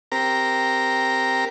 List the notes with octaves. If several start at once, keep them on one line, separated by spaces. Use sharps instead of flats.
C4 G4 A#4 A#5